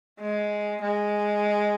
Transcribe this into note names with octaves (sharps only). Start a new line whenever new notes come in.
G#3
G#3